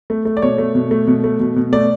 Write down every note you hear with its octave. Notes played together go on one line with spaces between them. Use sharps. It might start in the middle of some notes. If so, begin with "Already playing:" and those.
A3
A3
D5
B2 C#5
A3
B2
A3
B2
A3
B2
B2
A3 D5